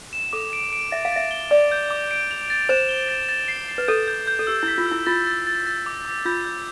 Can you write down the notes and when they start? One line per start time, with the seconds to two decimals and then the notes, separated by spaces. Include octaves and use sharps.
0.13 E7
0.33 A4 D6
0.53 D7
0.73 D7
0.92 E5 A6
1.05 F5
1.12 E5 A6
1.31 G7
1.51 D5 D6
1.72 G6
1.90 D6
2.11 D7
2.31 F7
2.50 A6
2.69 C5 E7
2.89 G7
3.09 A6
3.29 A6
3.48 C7
3.68 C7
3.78 B4
3.88 A4 G6
4.07 G6
4.27 G6
4.39 A4
4.47 G4 E6
4.63 E4
4.68 B6
4.78 F4
4.87 E4 E6
5.06 F4 A6
5.27 A6
5.47 A6
5.67 A6
5.86 D6
6.05 D6
6.25 F4 G6
6.45 G6